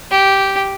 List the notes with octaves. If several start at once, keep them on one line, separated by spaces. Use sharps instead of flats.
G4